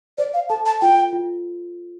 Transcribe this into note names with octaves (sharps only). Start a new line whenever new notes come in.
C5 D5
F5
A4 A5
A5
F4 G5
F4